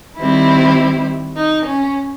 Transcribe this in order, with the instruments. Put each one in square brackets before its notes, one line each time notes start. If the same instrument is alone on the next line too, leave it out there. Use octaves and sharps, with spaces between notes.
[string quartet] D#3 G3 C4 E4
D#4
C#4